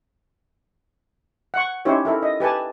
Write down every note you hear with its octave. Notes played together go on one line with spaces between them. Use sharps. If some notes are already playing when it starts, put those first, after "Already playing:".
F#5 C#6
C#4 D#4 E4 G4 C5 C#5
E4 A4 A#4
D#5
G4 B4 G#5 A5